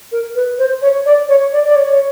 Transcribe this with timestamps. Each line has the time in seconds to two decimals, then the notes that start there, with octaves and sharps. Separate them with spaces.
0.12 A#4
0.35 B4
0.59 C5
0.82 C#5
1.06 D5
1.29 C#5
1.53 D5
1.65 D5
1.76 C#5
1.90 C#5